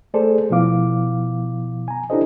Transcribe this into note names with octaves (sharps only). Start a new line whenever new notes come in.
A3 G#4 A4 C5 D5
B2 F3 B3 E4 F5 D6
G#5 A#5
D4 E4 G4 A4 C5 D#5